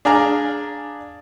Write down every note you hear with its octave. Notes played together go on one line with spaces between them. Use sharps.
D4 G#4 D5 F5 A#5